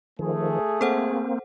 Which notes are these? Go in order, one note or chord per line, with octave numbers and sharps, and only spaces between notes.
D#3 F3 A3 G#4
A#3 C4 A4 C5 F#5